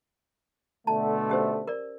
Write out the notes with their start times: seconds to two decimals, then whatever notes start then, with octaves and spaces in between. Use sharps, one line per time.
0.87 B2 D3 A3 A5
1.30 C#4 G4 C5
1.68 A#4 D5